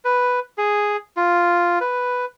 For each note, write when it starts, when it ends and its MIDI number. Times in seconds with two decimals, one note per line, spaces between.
0.05 0.40 71
0.58 0.97 68
1.17 1.79 65
1.81 2.25 71